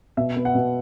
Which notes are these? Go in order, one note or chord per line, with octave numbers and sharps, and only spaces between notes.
B2 E5
B3
F#5
B2